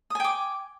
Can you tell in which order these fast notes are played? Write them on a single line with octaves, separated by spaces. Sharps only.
D#6 G#5 G5 D6